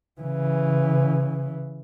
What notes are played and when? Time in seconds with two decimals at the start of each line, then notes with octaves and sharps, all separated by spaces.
0.21 C#3 E3